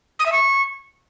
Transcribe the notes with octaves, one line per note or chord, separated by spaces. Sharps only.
D#6
E5
C#6